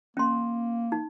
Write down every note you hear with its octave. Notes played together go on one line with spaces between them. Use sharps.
A#3 C#4 C6
D#4